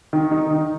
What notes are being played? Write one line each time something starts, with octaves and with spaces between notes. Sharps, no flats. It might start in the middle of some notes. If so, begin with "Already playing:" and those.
D#3
D#4
D#3